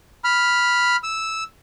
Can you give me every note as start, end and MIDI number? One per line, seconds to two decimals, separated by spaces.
0.24 0.96 83
0.24 0.96 89
1.03 1.44 88